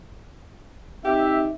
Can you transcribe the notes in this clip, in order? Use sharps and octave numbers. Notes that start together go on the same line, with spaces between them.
C4 D#4 G4 E5